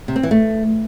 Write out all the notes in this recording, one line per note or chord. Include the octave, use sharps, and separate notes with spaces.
C3
C4
E3
A3